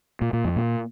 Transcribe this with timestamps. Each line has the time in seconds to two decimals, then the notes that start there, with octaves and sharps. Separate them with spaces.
0.22 A#2
0.33 A#2
0.45 F2
0.56 A#2